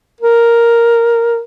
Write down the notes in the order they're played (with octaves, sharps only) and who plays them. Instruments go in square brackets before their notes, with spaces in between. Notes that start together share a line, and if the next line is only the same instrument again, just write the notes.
[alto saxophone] A#4